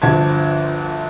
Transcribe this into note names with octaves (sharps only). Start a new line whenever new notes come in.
G1 D2 F3 A5 G#6